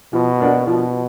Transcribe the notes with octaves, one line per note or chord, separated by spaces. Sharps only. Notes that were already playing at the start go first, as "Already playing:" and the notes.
B2 F3
A#3 D4 F#4
B2 F3